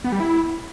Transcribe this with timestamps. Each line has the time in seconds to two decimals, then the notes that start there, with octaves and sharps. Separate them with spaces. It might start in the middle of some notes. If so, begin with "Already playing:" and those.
0.04 B3
0.12 G3
0.20 E4